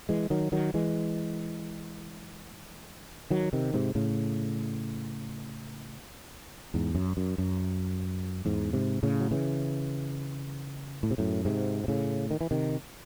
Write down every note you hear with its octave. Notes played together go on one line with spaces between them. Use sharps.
E3 G#3
D#3 F#3
D#3 F#3
E3 G#3
D#3 F#3
C3 D#3
G#2 C3
A2 C#3
E2 G#2
F#2
F#2
F#2
E2 G#2
G#2 C3
A2 C#3
F#3
C#3 E3
A2
C3
F#2 A2
G#2 C3
C3
A2 C#3
D#3
E3
C3 D#3